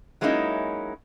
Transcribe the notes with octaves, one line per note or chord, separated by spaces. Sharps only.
F#3 G#3 A#3 C#4 D#4 E4